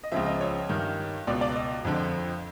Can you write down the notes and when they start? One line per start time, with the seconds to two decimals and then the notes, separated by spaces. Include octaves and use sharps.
0.03 D#5
0.12 C#2 C#3 F3 E5
0.26 D#5
0.41 C#5
0.69 G2 D#3
1.27 C#2 B2 D5
1.41 D5
1.56 D#5
1.85 F2 D3 F3